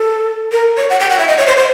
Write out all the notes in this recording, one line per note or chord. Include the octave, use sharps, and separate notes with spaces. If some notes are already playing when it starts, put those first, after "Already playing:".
Already playing: A4
A#4
C#5
F#5
G5
F#5
E5
D#5
C#5
C5
C5